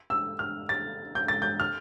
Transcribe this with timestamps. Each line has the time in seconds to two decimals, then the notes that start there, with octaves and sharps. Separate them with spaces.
0.10 E6
0.39 F6
0.69 A6
1.15 G6
1.28 A6
1.42 G6
1.60 F6